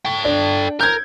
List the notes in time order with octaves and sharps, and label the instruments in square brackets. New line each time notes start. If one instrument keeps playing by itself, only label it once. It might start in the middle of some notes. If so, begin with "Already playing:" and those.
[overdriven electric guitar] A4 G5
[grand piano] D4
[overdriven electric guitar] A#4 [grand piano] G6 G#6